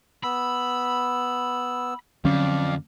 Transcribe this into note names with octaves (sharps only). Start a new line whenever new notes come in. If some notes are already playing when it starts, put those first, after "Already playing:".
B3 B5 E6
F2 D3 F#3 C#4 D5 F5